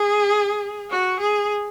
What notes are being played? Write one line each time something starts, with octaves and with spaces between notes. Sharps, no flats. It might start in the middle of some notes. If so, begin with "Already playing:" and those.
Already playing: G#4
F#4
G#4